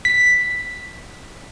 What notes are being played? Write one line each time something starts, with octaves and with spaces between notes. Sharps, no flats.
B6